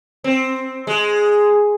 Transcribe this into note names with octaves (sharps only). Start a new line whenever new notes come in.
C4
G#3